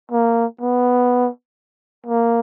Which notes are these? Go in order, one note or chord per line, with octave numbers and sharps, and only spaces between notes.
A#3
B3
A#3